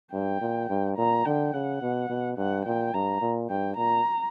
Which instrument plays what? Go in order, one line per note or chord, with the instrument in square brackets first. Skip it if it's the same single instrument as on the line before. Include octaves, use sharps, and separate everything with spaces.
[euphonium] G2 [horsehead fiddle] G5
[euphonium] A#2
G2
[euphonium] A#2 [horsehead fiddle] A#5
[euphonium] D3 [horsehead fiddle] G5
[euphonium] C#3 [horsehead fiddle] F#5
[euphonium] B2
B2
[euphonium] G2 [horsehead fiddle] F#5
[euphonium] A#2 [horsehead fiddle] G5
[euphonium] G2 [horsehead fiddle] A#5
[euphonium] A#2
[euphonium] G2 [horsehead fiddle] G5
[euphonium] A#2 [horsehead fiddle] A#5